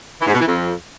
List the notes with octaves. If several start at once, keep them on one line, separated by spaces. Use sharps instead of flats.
E3
G#2
B2
E3
F2